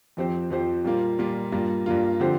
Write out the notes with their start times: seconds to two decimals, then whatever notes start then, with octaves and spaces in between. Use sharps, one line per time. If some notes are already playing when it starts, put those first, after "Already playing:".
0.17 F2 F3 C4 G4 C5
0.51 F2 F3 C4 G4 C5
0.85 A#2 G3 A#3 F4
1.19 A#2 G3 A#3 F4
1.52 G2 G3 A#3 F4
1.86 G2 G3 A#3 F4
2.20 D3 F3 C4 G4 C5